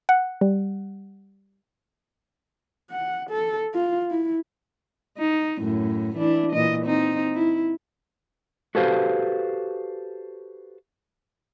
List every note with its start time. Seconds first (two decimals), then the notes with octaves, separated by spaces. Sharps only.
0.09 F#5
0.41 G3
2.91 F#5
3.30 A4
3.74 F4
4.11 E4
5.19 D#4
5.60 F#2 A2
6.17 E3 D4 E4
6.52 A#2 E3 D#5
6.85 C4 D#4
7.35 E4
8.75 F#4 G4 A4 B4 C5 F5